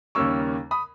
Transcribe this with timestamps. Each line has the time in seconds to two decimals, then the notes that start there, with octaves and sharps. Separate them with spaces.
0.15 D#2 C#3 G3 A#3 C#4 C#6 E6
0.71 B5 D#6